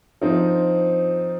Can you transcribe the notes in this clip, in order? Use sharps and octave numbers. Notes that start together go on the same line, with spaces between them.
F3 C4 D#4